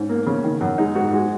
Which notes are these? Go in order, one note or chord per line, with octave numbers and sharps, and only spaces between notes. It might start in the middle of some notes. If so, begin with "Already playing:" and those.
Already playing: G#2 C#4
A#3
C#3
D#3
F#2
G#3 D#4
G#2 F#4
G#3 F#4